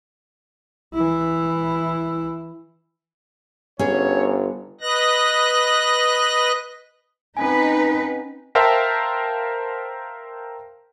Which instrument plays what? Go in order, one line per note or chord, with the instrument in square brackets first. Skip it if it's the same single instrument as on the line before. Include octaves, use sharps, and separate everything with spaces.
[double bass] E3 E4
[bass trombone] G1 [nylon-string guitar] C#4 G#4 [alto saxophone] C#5
[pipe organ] B4 D#5 F#6 A#6
[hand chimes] C4 C#4 G#5 [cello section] D#4 B4
[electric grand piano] A#4 C5 E5 F5 G5 A5